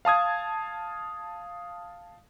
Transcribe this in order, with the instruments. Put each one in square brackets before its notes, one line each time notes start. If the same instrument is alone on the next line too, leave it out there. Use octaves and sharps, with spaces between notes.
[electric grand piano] F5 A5 D#6 G#6